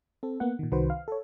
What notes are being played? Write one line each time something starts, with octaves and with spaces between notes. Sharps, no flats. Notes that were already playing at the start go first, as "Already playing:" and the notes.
C4 A4
A#3 B3 F#5
A#2 D#3
C2 D#3 F#4 B4 C5
F5
A4 C#5